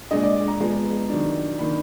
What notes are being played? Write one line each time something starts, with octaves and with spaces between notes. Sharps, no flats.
A#2 G#3 D4 D#5
D5
D5
A#5
F3 G#3 B3
D#3 F#3 D4
D#3 A#3 D4 B5